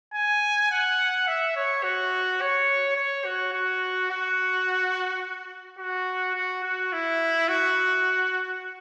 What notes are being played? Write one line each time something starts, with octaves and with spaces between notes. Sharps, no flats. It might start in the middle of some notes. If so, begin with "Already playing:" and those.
G#5
F#5
E5
C#5
F#4
C#5
C#5
F#4
F#4
F#4
F#4
F#4
F#4
E4
F#4